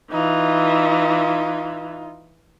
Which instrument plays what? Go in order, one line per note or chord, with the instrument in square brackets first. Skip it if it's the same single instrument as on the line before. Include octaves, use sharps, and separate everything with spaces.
[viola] E3 [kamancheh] D#4 F4